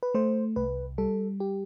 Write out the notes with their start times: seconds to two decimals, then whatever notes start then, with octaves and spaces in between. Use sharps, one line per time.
0.03 B4
0.14 A3 C5
0.56 C2 B4
0.98 G3 A4
1.40 G4